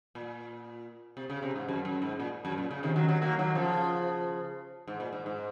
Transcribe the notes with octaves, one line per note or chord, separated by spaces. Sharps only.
A#2
C3
C#3
C3
G#2
F#2
F#2
G#2
A#2
F#2
A#2
C#3
C3 D#3
D#3 F#3
D#3 F#3
F#3 A#3
D#3 F#3
C#3 F3
G#2
A#2
G#2
G#2